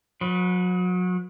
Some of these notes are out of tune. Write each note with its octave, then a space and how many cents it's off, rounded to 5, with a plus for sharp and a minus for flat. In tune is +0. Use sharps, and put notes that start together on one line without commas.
F#3 -35 B4 +0